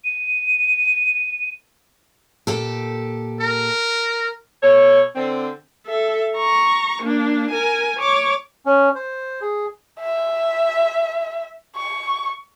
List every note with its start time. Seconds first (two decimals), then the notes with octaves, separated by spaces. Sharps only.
0.04 D#7
2.47 A#2 G4 A4
3.40 A#4
4.63 B2 A4 C#5
5.16 D3 C4
5.86 A4 E5
6.37 A#5 C#6
7.03 A#3 D4
7.51 A#4 G#5
7.99 C#5 D6
8.66 C#4
8.95 C5
9.41 G#4
10.00 E5
11.76 C#6